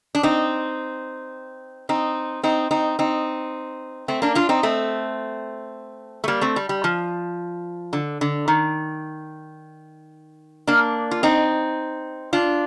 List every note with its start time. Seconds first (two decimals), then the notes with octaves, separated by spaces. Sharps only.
0.15 D4
0.23 C4 D#4
1.89 C4 D#4
2.43 C4 D#4
2.71 C4 D#4
2.99 C4 D#4
4.08 A3 C4
4.22 A#3 D4
4.35 D4 F4
4.49 C4 D#4
4.63 A3 C4
6.24 A3
6.28 G3 A#3
6.41 A3 C4
6.56 G3
6.69 G3
6.84 F3
7.93 D3
8.21 D3
8.48 D#3
10.67 A#3 D4
11.11 F4
11.23 C4 D#4
12.33 D4 F4